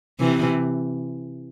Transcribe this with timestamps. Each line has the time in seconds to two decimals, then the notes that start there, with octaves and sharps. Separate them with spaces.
0.20 C3 E3